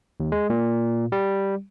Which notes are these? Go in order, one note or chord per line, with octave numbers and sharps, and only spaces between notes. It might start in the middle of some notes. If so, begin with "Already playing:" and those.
D#2
G#3
A#2
G3